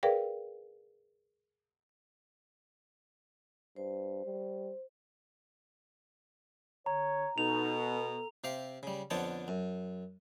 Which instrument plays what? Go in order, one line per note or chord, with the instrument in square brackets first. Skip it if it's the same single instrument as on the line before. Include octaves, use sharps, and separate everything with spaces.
[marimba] G#4 A#4 B4 D5 F5 G5
[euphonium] G2 [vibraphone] C5
[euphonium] G3
[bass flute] D3 [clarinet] C#5 [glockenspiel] A#5
[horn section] B2 [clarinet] D#4 [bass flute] A4 [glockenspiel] F7
[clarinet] B3
[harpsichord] C3 G4 F5
C#3 G3
F2 D3 B3 C#5 G5 A5
F#2